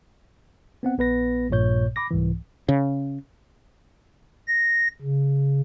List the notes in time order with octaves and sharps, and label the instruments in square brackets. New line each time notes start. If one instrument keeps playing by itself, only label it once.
[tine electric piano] B3 C4 F#5
A#1 B3 B4 A#6
A#1 G2 A#2 C#5 G6
B5 D6 A#6
C2 G#2 E3
[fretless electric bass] C#3
[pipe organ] A#6
C#3